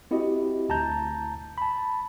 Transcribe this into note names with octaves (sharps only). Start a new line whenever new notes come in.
C4 E4 F#4 G4 D#5
D2 A5 A#5 G6
A5 B5